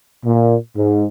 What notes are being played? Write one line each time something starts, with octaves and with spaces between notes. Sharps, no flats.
A#2
G#2